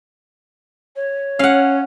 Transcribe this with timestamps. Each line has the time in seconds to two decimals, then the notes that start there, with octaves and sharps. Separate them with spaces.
0.96 C#5
1.39 C#4 F5 F#5